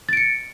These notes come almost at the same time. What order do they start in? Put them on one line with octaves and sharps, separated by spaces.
A6 D7 C#7